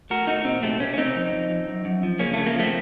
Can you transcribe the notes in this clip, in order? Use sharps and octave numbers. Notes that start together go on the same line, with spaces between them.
A3 F#4 A#4
A3 D#4 F#4
A#2 C4 D#4
C3 A3 C4
C3 A#3 C#4
C#4
C3 C4 D#4
F2
F2
F2
F#2
F#2
F3
C#3 A#3 C#4
C#3 A3
A#3
F3 A3 C4